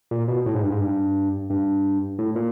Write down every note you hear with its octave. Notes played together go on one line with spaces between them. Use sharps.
A#2
B2
A2
G#2
G2
G#2
G2
G2
A2
A#2